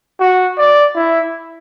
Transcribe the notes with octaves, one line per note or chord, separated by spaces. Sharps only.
F#4
D5
E4